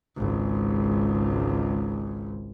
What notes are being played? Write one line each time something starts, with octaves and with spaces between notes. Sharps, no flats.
G#1 C#2